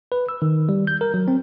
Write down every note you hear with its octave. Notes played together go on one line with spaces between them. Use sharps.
B4
E6
D#3
G3
G6
A#4
F#3
C4